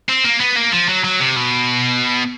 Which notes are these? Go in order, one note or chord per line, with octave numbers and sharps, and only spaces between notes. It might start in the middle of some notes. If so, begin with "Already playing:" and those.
C4
A#3
B3
A#3
F3
F#3
F#3
C3
B2